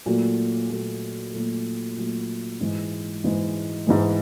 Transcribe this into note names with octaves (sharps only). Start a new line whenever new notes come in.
A#2 F#3 A3
A#2 F#3 A3
A#2 F#3 A3
A#2 F#3 A3
G#2 E3 G#3
G#2 E3 G#3
G#2 E3 G#3